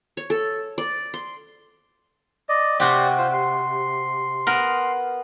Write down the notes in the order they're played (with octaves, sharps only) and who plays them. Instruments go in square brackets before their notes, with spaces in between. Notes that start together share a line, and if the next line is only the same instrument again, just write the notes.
[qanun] C#5
A4
D5
C6
[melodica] D5 D#5
[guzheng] C3 F#4 G4 [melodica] C5 D5
[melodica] F4 C5
C6
[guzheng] B3 A#4